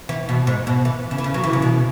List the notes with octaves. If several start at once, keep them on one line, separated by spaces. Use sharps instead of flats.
E3
B2
G#2
B2
E3
C#3
E3
C#3
F#3
E3
C#3
B2